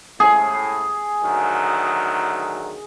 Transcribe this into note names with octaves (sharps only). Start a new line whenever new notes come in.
A2 G#4
D2 D#3 F#3